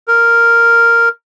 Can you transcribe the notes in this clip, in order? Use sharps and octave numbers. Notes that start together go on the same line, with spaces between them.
A#4